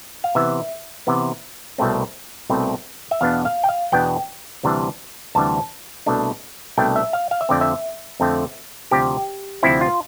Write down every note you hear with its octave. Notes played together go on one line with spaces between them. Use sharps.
F5
C3 E3 B3 E5
C3 E3 B3
C2 B2 A3 C4
C2 B2 A3 C4
E5
E2 B2 B3 D4 F5
F5
G5
F5
E2 B2 B3 D4 G5
D2 C3 E3 G3 D4
D2 C3 E3 G3 D4 A5
C2 B2 A3 D4
C2 B2 A3 D4 G5
E5
F5
F5
E5
F2 D3 A3 C4 D5
E5
F2 D3 A3 C4
D2 C3 F3 C4 G4
D2 C3 F3 C4 E4
F4